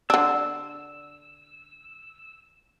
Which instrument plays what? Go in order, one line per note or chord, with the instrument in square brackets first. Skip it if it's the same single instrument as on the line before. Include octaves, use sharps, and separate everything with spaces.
[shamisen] D3 D4 [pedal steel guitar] E6